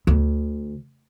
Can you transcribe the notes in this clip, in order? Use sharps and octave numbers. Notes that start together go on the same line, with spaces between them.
D2